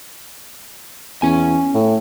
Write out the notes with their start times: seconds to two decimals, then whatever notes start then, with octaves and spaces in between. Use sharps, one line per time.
1.22 E2 C#4 G#5
1.74 A2